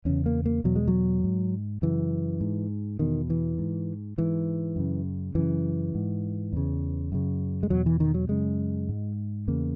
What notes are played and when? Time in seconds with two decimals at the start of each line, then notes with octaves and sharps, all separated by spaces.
0.05 E2 C#3 C#4
0.26 A#3
0.46 A#3
0.64 E2 B2 F#3
0.76 G#3
0.88 F#3
1.24 G#2
1.82 F#2 C#3 E3
2.41 G#2
2.99 E2 B2 D#3
3.30 E3
3.58 G#2
4.18 G#2 E3
4.76 F#2 C#3
5.35 F#2 C#3 E3
5.95 G#2
6.52 E2 C#3
7.12 F#2 C#3
7.63 G#3
7.70 E2 B2 F#3
7.86 E3
8.00 D#3
8.14 F#3
8.29 F#2 C#3 G#3
8.89 G#2
9.48 E2 C#3 A#3